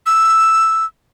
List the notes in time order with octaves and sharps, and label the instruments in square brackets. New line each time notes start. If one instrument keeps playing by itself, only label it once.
[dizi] E6